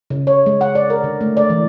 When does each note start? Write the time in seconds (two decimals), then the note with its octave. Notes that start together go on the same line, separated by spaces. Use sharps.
0.10 C#3
0.27 C#5
0.46 G#3
0.61 F#5
0.75 D5
0.90 A#4
1.04 D3
1.21 A3
1.37 D5
1.50 E3